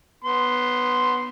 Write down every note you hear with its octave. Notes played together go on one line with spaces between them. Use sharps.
B3 C6